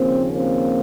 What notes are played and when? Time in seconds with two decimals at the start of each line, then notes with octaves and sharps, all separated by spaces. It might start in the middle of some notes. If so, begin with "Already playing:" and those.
Already playing: D#2 C#3 F3 A#3 C4
0.33 A#3 C4